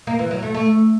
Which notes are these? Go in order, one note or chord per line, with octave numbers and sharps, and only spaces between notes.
A#3
E3
F#3
A3
A3